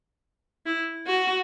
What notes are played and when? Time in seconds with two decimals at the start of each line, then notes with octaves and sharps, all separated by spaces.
0.66 E4
1.07 F#4